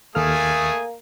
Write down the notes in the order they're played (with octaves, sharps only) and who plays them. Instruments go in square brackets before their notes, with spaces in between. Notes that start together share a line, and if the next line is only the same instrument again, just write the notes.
[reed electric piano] D#2 A4 F6 [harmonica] A3 G#4 [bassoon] A#3 [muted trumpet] G#5